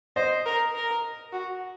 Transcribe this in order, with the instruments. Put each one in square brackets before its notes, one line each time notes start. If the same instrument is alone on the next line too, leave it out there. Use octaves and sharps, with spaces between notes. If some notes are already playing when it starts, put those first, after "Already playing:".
[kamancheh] C5 [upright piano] D#5
[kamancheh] A#4
A#4
F#4